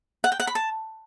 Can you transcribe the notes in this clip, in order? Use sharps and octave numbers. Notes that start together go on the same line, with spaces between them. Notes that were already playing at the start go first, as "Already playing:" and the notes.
F#5
G5
F#5
B5
A5